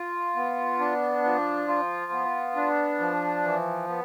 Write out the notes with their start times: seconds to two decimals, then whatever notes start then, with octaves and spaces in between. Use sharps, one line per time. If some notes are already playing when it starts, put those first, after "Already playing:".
Already playing: F4
0.36 B3
0.79 D4
1.24 F3
1.68 F4
2.12 B3
2.56 D4
2.99 F3
3.43 E3
3.88 B3